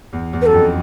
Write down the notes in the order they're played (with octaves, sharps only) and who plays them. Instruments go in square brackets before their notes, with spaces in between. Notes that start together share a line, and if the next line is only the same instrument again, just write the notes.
[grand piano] E2
E2
[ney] B4
[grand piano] F#2 [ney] A4
[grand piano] F2